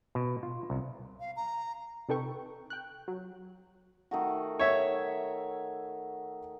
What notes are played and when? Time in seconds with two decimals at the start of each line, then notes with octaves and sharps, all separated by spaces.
0.15 B2
0.43 F4
0.70 C2
1.20 F5
1.36 A#5
2.09 C3 D#4 A4 B4 G5 C#6
2.70 G5 F#6
3.08 F#3
4.11 D#3 A3 F#4
4.59 C#5 E5